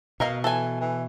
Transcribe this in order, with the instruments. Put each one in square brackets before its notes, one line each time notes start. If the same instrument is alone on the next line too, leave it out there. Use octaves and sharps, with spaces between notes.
[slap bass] B2 [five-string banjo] A#4 D#5 F5
[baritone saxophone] E3 [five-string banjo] A4 G#5
[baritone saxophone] E3